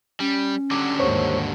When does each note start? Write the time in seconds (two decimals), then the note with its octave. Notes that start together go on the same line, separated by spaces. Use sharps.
0.20 G3 C#4
0.71 D3 F#3 G3 D6
0.99 D#2 G#2 C5 C#5 C#6